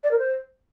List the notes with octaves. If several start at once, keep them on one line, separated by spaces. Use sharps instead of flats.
D5
A#4
C5